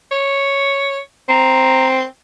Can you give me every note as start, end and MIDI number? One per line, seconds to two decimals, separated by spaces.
0.11 0.99 73
1.29 2.04 60
1.29 1.87 82